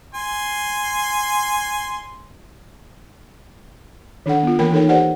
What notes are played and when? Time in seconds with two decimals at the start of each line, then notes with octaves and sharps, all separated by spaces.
0.14 G#5 C6
4.26 D#3 D4 A4 F#5
4.43 B3 F4
4.59 E3 A#3 A#4 G5 B5
4.73 D#4 A4 A#4 C#5 G5
4.89 G4 A#4 C5 D5 F#5 G#5